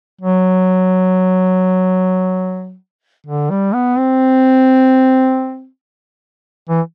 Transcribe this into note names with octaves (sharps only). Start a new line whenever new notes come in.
F#3
D3
G3
B3
C4
E3